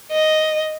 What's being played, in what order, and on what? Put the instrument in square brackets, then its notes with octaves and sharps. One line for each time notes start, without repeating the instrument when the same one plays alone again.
[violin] D#5